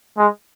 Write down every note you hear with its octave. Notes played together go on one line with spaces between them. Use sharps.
G#3